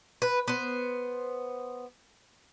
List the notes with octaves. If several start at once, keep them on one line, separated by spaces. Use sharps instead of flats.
B4
B3 C5